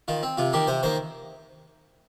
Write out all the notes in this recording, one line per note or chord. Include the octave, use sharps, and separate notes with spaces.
D#3 F4
C4
C3 F4
D#3 A#3 G4
C3 C5
D#3 A#3 C5